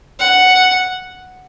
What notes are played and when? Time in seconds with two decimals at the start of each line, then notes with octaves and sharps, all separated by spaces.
0.19 F#5